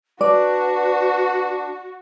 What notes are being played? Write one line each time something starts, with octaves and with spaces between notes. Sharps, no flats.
D4 F#4 B4 D5